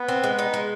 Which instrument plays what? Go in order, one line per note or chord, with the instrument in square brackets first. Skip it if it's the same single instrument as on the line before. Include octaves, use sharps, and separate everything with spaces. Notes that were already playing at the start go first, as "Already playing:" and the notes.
Already playing: [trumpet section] B3
[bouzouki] C4
G#3
D#4
G#3